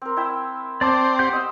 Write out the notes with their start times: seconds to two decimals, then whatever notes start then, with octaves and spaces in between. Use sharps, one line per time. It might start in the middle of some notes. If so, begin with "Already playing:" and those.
0.02 C4 A#4
0.17 E4 E5 G5
0.81 C4 D5 A5 D6
1.19 G4 F#5 G6
1.33 D#5 C6 E6